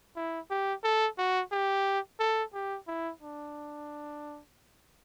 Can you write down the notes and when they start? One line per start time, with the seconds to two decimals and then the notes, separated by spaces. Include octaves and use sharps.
0.16 E4
0.50 G4
0.84 A4
1.18 F#4
1.52 G4
2.20 A4
2.54 G4
2.87 E4
3.22 D4